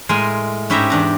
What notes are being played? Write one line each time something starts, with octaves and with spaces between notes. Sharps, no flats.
A2 G#3 A#4 G#5 C6
G#2 C#4 E4 G4 E5 A#5
E2 D4 A#5